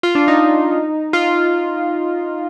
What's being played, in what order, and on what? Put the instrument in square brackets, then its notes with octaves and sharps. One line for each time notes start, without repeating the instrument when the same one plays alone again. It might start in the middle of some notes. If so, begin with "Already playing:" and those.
[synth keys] F4
D4
D#4
F4